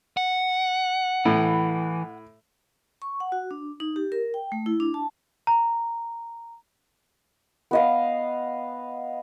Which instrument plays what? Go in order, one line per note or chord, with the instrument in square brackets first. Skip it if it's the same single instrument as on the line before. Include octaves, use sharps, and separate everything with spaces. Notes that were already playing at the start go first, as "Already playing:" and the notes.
[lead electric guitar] F#5
[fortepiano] A2 [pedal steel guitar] E3
[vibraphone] C#6
F#5
F#4
D4
D#4
G4
A#4
G5
A3
E4
D4
A5
[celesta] A#5
[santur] B3 D#5 F5